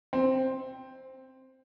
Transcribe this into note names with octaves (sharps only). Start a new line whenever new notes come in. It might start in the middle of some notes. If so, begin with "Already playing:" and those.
C4